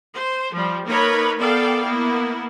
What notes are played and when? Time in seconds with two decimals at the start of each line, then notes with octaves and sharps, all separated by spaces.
0.14 C5
0.53 F3 G3
0.86 A#3 D#4 A#4 B4 C#5 B5
1.37 B3 A4 A#4 D5 F5 G5
1.84 A#3 B3 E4